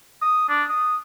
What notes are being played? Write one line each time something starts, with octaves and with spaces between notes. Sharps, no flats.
D#6
D4
D#6